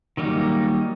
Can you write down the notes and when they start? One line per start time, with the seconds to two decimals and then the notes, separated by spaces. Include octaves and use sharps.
0.17 D#3 F#3 G3 A#3 D#4